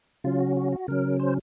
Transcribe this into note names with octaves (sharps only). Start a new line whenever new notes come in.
C#3 F#3 C#4 F4
F#4
F#4
F#4
C#3 F#3 C#4 A#4
C5